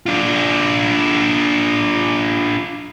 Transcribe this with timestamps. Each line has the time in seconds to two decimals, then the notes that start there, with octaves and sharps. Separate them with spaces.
0.06 D4 F4